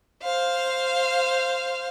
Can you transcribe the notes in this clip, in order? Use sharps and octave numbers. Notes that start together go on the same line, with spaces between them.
C5 F5